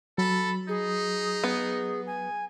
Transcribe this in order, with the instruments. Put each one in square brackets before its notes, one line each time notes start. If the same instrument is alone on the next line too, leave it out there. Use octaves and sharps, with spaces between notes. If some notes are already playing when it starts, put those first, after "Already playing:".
[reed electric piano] F#3 [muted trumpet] A4 [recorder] B5
[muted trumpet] D#4 [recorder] G#4
[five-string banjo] B3
[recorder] G#5